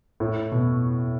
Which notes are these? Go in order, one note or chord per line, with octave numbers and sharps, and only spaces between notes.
A2
B2